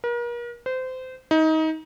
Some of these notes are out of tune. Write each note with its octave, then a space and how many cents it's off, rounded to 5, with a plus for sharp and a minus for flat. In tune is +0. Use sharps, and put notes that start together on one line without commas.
A#4 +40
C5 -25
D#4 +25